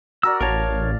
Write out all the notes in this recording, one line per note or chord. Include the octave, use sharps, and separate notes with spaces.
F#4 A#4 D5 E6
A1 A#4 C#5 F5 A5